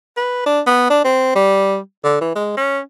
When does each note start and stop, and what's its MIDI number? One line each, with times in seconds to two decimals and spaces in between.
0.17 0.42 71
0.46 0.61 62
0.66 0.90 59
0.90 1.03 62
1.04 1.35 60
1.35 1.77 55
2.04 2.18 50
2.21 2.32 52
2.35 2.55 56
2.57 2.80 61